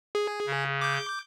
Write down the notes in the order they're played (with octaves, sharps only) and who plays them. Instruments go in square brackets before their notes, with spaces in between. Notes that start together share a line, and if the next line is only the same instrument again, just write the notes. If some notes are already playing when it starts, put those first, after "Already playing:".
[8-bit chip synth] G#4
[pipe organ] C#3
[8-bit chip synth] D6 G6